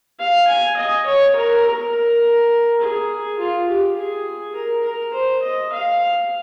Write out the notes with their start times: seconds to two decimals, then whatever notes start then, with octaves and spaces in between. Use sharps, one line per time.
0.19 F5
0.48 G#5
0.77 D#5
1.06 C#5
1.35 A#4
1.65 A#4
2.80 G#4
3.39 F4
3.68 G4
3.97 G#4
4.55 A#4
4.84 A#4
5.13 C5
5.43 D#5
5.72 F5